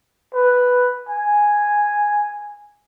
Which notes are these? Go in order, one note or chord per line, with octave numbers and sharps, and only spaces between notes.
B4
G#5